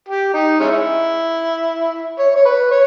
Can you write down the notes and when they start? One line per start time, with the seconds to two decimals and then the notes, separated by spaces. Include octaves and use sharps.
0.08 G4
0.34 D#4
0.60 G#3 C#4 E4
2.19 C#5
2.36 C#5
2.45 B4
2.71 C#5